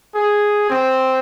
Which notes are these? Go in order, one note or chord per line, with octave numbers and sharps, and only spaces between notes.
G#4
C4